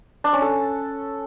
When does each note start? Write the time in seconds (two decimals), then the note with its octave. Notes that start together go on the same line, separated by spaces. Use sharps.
0.24 D4
0.33 C#4
0.42 A4